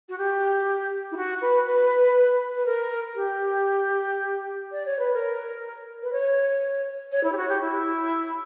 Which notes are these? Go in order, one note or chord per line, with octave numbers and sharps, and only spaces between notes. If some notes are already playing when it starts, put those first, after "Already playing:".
F#4
G4
E4
F#4
B4
B4
B4
A#4
G4
D5
C#5
B4
A#4
B4
C#5
C#5
E4
G4
F#4
G4
E4